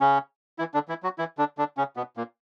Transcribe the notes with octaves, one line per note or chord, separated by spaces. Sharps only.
C#3 C#4
E3 E4
D3 D4
E3 E4
F#3 F#4
E3 E4
D3 D4
D3 D4
C#3 C#4
B2 B3
A#2 A#3